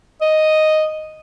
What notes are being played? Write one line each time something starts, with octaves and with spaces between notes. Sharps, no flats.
D#5